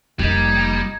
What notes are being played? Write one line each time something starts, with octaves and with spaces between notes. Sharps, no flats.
F1 G3 A#3 D#4 G#6